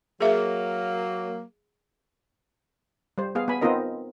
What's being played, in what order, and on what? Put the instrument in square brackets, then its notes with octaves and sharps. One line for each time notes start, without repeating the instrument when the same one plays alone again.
[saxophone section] F#3 A#3 [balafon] G#4 E5
[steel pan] G3 C5
B3 G#4 F5
B3 G#5 B5
B3 C4 D#4 F4 A#4 D#5